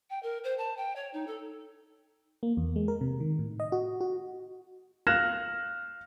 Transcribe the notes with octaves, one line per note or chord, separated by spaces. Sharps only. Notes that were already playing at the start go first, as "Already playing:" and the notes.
G5
A#4
C5
A5
G5
C#5
D#4
A4
A#3
E2
G#3
A#4
C3
D#3
A2
D#5
F#4
F#4
F5 F6 F#6 G#6 A#6 E7